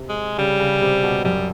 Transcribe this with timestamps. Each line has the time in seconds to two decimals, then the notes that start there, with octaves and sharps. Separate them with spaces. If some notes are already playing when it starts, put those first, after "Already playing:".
Already playing: C3
0.09 G#3
0.38 C#3 G3
0.60 C#3
0.82 C3
1.03 B2
1.25 F#2 G3